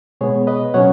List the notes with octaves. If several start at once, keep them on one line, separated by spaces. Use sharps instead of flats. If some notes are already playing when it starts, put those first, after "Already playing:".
B2 G#3 B3 G#4 C#5
B4 D#5
B2 F#3 C#4 C#5 F#5